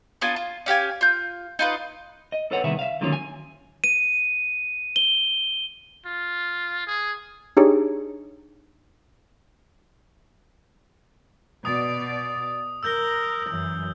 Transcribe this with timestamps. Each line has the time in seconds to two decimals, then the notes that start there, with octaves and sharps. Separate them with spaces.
0.21 B3 D4 F4 G#5
0.36 F4
0.66 C#4 G4 F5 G#5
1.01 F4 G6
1.59 D#4 F4 B4
2.32 D#5
2.51 A4 B4 C#5 F#5
2.64 C2 D#3 B3 G#4 E5
2.79 E5 F5
3.01 D3 D#3 F3 F#3 A#3 C#4
3.13 G#5
3.84 D#7
4.96 G7
6.05 F4
6.87 G#4
7.57 D4 D#4 G4 G#4 C#5
11.65 B2 D5 D#6
12.83 A#4 E6 G6 G7
13.50 F#2 E3